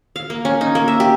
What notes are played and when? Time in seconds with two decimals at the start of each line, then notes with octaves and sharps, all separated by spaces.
0.16 F5
0.30 A#3
0.45 C#4
0.61 D#4
0.75 A#3
0.88 E5
1.00 G4